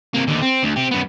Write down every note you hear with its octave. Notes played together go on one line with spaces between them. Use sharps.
C3 A#3
D#2 D3
C4
D2
C4 G4
F#2 B3